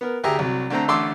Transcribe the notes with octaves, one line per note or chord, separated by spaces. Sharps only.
B3 A#4
D2 G4 G#4 E5 A#5
C2 F#3
D3 A3 C4 A#5
A1 D3 A3 C6 D6 E6